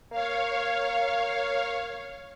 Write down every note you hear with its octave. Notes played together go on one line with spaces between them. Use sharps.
A#3 C#5 F5